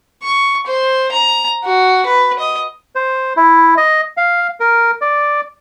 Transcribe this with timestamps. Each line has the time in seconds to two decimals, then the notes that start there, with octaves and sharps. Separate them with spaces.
0.22 C#6
0.66 C5
1.12 A#5
1.64 F#4
2.06 B4
2.39 D#5
2.95 C5
3.37 E4
3.77 D#5
4.17 F5
4.60 A#4
5.01 D5